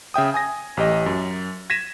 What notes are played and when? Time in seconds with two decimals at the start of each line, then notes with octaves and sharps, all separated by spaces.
0.14 C#3 E5 G5 D#6
0.34 G#5 D#6 A#6
0.77 A1 G4 D#5
1.06 F#2
1.70 G#6 A#6 B6 D#7 E7